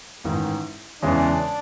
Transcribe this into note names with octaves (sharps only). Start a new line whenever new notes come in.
A1 G#2 D#3
E2 C#3 E3 G#3 C#4 D4